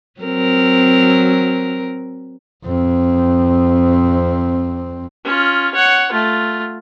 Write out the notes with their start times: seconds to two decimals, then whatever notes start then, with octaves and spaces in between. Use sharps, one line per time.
0.20 F#3 C4 A#4
2.66 F2 C4
5.25 C#4 F4
5.74 C#5 F#5
6.12 A3 F4